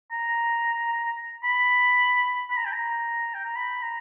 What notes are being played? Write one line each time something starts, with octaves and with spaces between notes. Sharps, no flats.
A#5
B5
B5
A#5
G5
A#5
G5
A#5
B5
A#5